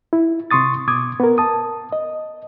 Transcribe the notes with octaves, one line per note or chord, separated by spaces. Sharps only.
E4
C3 C6 C#6 D#6 A6
B2 D6 D#6 G#6
B3 A#4
A5 D#6
D#5